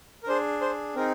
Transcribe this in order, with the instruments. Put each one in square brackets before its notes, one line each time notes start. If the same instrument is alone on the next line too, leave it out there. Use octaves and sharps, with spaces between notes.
[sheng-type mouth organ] A#4
D4 G#4 C5
C5
C4 D#4 G#4 A#4